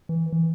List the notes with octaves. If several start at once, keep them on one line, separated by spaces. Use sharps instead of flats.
E3
E3